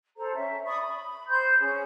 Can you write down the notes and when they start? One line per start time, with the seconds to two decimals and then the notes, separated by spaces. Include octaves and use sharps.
0.17 A4 C5 A#5
0.34 C#4 E5
0.66 D5 B5 C#6 D#6
0.81 B5
1.28 C5 B5 C6 G6
1.59 C#4 G#4